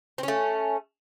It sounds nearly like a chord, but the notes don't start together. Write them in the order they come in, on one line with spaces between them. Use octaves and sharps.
C4 C#4 A3